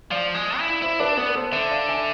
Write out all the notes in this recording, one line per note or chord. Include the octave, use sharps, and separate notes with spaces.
F3 D5 F5
G#3
E4
E4 C5 E5
D4 B4 D5
B3 B4 D5
A4 C5
D3 C5 E5
D5 F5
E5 G#5